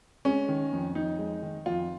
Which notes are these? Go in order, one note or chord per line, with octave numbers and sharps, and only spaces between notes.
G#3 C#4
D#3
F2
F2 D#4
G#3
D#3
F2 F4